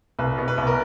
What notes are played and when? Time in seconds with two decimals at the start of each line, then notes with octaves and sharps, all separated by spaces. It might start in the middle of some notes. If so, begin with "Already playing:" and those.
0.19 C2 B4
0.38 B2
0.48 B4
0.58 C2
0.67 A#4